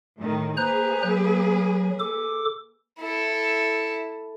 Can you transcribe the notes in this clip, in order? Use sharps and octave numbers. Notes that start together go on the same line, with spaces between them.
A2 D#3
A#3 G#4 B4 C5 A#5 F#6
F#3
A4 D6
E4 A4